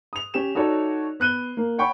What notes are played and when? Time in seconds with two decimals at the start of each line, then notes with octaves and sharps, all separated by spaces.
0.13 D#6 F7
0.34 C#4 G4 E7
0.55 D#4 F#4 A4 C#5 D5
1.20 B3 F#6 D#7 G7
1.57 A#3
1.78 C#5 F#5 G5 B5 C#6